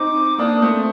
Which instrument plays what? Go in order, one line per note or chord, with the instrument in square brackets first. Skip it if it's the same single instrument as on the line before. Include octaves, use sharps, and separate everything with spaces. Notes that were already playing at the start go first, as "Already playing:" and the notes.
Already playing: [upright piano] C4 D#4 [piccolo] D6
[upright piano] A#3 D4 [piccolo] D#6
[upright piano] A3 C4 [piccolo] D#6